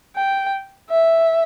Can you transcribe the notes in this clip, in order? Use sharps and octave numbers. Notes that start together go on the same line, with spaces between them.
G5
E5